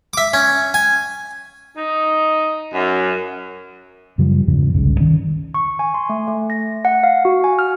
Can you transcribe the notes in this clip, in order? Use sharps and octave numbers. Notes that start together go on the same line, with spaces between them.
E5 D6
C#4
G#5
D#4
F#2
F#2 C#3 F3 G3
E2 G#2 C#3 F3
G1 C2 G#2 C#3
D#3 C#4
C#6
G#5
C6
A3
A3
A#6
F#5
F5
F#4
G#5
F6